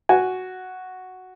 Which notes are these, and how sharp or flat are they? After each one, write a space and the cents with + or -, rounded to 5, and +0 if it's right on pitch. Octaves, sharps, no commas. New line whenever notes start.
F#4 +0 G#5 +0